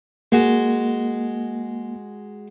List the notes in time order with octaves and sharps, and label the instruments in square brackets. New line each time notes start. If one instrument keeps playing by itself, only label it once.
[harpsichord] G#3 F#4 [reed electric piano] A#3